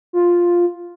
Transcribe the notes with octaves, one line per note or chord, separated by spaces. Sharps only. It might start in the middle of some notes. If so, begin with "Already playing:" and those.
F4